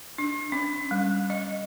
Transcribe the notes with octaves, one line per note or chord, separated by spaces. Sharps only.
D4
C#4
G3
D#5